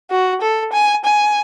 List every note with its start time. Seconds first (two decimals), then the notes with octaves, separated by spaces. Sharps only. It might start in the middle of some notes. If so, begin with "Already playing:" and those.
0.11 F#4
0.41 A4
0.73 G#5
1.04 G#5